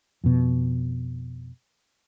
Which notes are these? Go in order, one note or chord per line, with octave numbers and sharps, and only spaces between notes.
F2 B2